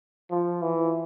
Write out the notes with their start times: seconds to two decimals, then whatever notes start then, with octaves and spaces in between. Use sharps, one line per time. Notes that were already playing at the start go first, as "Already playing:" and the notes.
0.31 F3
0.62 E3